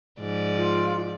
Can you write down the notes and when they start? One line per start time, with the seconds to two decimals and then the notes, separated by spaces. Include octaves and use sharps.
0.20 G#2 F3 D5
0.55 F4